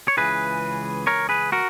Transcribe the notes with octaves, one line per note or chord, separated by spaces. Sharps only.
C#5
C#2 C#3 E3 G#4 B4
A#4 C#5
G#4 B4
F#4 A#4